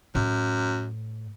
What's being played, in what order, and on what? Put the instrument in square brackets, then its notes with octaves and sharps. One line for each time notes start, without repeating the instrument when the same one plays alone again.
[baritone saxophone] F#2 [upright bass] A2